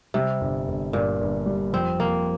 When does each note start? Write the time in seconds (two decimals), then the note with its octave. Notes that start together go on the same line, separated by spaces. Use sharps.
0.14 C3 G3
0.41 G1
0.68 G1
0.93 G2 A#2
1.21 G1
1.46 G3
1.73 F2 C4
2.00 F2 A#3